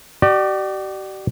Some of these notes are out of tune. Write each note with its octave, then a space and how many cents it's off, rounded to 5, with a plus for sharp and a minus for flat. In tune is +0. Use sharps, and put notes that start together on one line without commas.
G4 -45 D5 +30